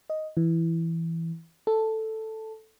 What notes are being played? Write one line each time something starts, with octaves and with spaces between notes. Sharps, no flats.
D#5
E3
A4